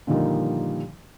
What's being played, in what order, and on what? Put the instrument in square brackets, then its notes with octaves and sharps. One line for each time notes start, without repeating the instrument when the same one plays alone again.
[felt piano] A#2 D3 D#3 F3 G3 D#4